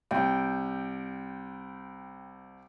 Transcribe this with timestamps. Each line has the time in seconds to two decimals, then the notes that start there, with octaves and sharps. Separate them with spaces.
0.11 C2 G5